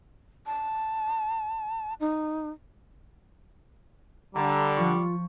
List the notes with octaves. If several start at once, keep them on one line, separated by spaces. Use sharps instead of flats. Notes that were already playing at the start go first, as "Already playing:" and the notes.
A5
D#4
D3 G3 A#5
F3 F4 C#6